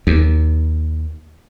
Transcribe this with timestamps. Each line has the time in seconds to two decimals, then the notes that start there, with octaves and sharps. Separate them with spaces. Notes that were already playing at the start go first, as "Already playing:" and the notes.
0.07 D#2